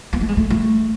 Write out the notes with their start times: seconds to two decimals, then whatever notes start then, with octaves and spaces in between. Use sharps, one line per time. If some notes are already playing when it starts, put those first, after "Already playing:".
0.13 B3
0.21 A3
0.29 G#3
0.37 A3
0.50 A3